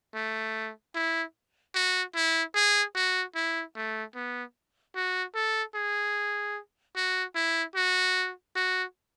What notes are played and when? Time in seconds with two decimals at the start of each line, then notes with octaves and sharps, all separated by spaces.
0.15 A3
0.95 E4
1.75 F#4
2.15 E4
2.55 G#4
2.95 F#4
3.35 E4
3.75 A3
4.15 B3
4.95 F#4
5.35 A4
5.75 G#4
6.96 F#4
7.35 E4
7.75 F#4
8.55 F#4